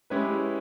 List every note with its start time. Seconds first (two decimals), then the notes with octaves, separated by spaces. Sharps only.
0.10 G#3 C#4 E4 G4 B4